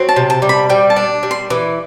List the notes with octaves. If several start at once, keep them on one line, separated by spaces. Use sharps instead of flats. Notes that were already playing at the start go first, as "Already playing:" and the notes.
Already playing: F#3 C4
A5
C3
A5
G3
B5
G3 G5
A5
D4
G3
C6
E3 D6